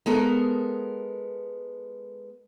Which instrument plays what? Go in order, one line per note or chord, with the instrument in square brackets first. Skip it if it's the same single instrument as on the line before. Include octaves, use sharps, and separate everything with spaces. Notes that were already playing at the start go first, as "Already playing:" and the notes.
[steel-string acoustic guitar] G#3 B3 A4 A#4